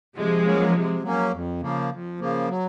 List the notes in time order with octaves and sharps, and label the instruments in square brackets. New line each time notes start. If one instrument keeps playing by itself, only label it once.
[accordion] C3 [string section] F3 G#3
[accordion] F#3 A#3 C#4
C3
F#3 A#3 C#4
F2
C#3 F3 A#3
F2
C#3 F3 A#3
F#3